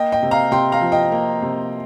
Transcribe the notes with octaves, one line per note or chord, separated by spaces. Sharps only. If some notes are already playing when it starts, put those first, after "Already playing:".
Already playing: A#3 D#5 G5
D#5 G5
C3
F5 A#5
C3 G5 C6
F5 A#5
F3
D#5 G5
A#3
C3